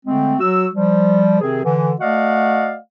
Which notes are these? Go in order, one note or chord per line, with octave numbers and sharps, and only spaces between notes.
D3 G#3 A3 C4
F#3 F#4 E6
F3 G3
C3 D#3 C4 G#4
D3 E3
A3 F#4 D5 D#5 F5 F#5